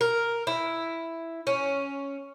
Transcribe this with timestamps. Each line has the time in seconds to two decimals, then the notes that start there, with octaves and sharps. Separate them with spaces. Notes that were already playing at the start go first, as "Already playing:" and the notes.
0.01 A#4
0.47 E4
1.47 C#4